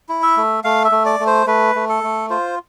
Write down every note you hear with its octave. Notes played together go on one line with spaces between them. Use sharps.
E4
E5
A3
A3 F5
E5
A3
D5
A3
C5
A3 B4
A3
A4
A3
F4 C5